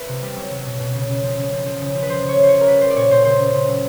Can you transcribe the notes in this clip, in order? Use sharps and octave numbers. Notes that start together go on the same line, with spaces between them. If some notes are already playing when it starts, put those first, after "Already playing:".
Already playing: B4 E5
C3
G3
F#3
F#3
B2
B2
C#3
C#3
F3
C#3
F3
F3
C#3
F3
B4
F3 C5
C#3
C#5
C#3 C5
F3 C#5
A#4
G3 B4
G3 C5
D5
A#2 C#5
A#2 C5
C#3 C5
C#3
C#3
F#3